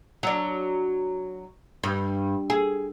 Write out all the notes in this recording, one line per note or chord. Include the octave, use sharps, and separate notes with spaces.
F#3 D4
G2
G#4